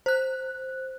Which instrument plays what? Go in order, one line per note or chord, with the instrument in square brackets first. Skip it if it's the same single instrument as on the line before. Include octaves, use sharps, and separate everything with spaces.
[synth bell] C5 F#6